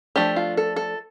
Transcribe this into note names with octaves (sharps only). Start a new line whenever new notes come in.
F3 A3 D4 G4
F4
A4
A4